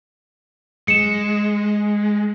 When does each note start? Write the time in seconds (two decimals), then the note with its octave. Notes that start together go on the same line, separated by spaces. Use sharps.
0.88 G#3 C#7 E7